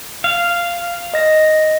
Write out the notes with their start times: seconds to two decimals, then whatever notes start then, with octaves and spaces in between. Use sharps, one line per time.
0.24 F5
1.14 D#5 A#6